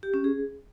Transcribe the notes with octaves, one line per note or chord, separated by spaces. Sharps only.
G4
C#4
G#4